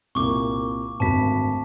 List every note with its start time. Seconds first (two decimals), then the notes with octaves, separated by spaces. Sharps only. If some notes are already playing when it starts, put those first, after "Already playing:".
0.15 C2 A#2 A#3 C#6 D6
1.00 G#1 D2 A5 B6